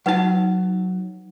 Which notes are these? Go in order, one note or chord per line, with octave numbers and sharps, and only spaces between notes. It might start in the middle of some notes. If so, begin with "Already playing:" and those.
F#3 D#4 B4 F#5 A5